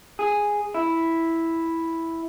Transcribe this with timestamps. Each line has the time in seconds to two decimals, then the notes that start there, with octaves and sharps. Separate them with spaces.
0.19 G#4
0.74 E4